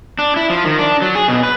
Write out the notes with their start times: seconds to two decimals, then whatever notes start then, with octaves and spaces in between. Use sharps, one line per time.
0.19 D4
0.37 E4
0.50 F3
0.65 D#3
0.79 D4
1.02 F#3
1.15 G#4
1.28 B2
1.43 B4